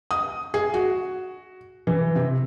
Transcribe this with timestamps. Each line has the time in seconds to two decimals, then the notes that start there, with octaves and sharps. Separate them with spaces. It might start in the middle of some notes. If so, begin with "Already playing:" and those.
0.11 D#6
0.54 G#4
0.74 F#4
1.87 E3
2.15 C3